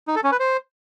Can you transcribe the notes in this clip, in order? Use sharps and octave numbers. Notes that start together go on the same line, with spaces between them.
D#4
A4
C#4
B4
C5